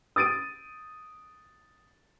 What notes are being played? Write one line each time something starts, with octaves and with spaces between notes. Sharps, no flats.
D#6 A6 D7 D#7